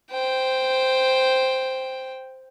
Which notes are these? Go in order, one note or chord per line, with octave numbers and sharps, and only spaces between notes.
C5 G5